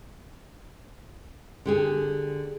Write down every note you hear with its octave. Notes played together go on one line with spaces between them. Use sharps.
D3 G4 G#4